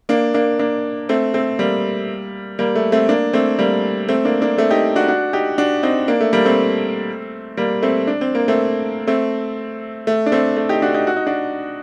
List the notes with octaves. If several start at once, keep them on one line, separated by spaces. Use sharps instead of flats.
A#3 D4
A#3 D4
A#3 D4
A3 C4
A3 C4
G3 A#3
G3 A#3
A3
A3 C4
A#3 D4
A3 C4
G3 A#3
A3 C4
A#3 D4
A#3 D4
A3 C4
D#4 G4
D4 F#4
D4 F#4
D#4 G4
D4 F#4
C4 D#4
A#3 D4
A3
G3 A#3
A3 C4
G3 A#3
A3 C4
D4
C4
A#3
A3 C4
A3 C4
A3
D4
A3 C4
A3
D#4 G4
D4 F#4
D#4 G4
F#4
D#4
D4 F#4